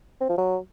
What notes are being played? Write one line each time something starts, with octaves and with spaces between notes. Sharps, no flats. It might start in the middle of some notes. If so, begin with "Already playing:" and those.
C4
F3
F#3